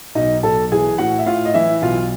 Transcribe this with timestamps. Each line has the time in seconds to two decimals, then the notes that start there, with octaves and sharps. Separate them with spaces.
0.15 B1 D#4 D#5
0.43 B1 A4 A5
0.72 E3 G#4 G#5
0.98 A2 F#4 F#5
1.19 E5
1.26 A2 F4 F5
1.45 D#5
1.54 E3 E4 E5
1.82 B1 F4 F5